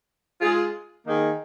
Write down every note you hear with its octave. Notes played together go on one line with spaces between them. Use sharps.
G#3 F4 G#4
D#3 A#3 D#4 G#4